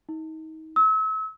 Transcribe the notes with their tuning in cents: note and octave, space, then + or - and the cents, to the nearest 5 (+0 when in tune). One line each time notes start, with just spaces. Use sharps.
D#4 +30
E6 -35